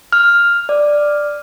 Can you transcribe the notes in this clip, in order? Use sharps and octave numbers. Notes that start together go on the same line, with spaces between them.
F6
D5